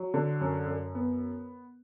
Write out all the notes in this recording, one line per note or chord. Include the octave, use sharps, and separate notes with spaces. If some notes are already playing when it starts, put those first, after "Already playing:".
Already playing: F#3
D3
F#2
F#2
B3